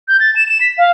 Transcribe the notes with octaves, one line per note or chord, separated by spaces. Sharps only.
G6
A6
E7
E7
B6
F5